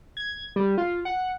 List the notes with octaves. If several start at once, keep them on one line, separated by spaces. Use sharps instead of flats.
G#6
G3
F4
F#5